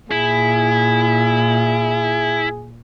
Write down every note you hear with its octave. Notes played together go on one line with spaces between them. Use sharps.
A#2 E4 G#4